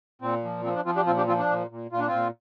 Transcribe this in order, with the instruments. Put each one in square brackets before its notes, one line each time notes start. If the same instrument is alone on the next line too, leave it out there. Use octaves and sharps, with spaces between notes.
[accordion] A#2 C4
F3
F3 C4
D4
F3 C4 F4
D4 G4
A#2 C4 F4
D4 G4
F3 C4 F4
D4
A#2
A#2
A#2 F4
D4
C4 F4
A#2